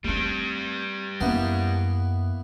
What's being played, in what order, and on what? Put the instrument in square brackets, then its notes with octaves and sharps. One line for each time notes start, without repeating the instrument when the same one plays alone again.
[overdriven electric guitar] G3 D4 [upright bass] A3 C4
[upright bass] F#2 [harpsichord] E3 A#3 B3